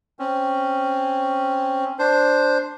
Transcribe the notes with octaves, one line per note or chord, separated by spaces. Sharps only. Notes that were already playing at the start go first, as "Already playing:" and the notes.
C4 C#4
D4 C5